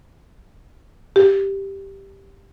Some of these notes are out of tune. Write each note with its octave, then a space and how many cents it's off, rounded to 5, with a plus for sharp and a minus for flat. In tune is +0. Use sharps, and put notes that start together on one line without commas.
G4 +0